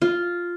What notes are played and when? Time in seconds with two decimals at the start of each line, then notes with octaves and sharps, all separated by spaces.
0.02 F4